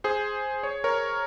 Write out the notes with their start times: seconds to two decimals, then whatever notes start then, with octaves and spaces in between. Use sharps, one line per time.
0.04 G#4 C5
0.63 C#5
0.84 A#4 C#5